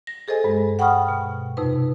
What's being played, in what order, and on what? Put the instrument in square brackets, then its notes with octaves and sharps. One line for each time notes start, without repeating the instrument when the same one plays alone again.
[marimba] A#6
G#4 A4 C5 D#5 G#5
G2 G#3
F#5 G5 B5 C#6 D#6 F6
B2
F2 C3 D#4 B4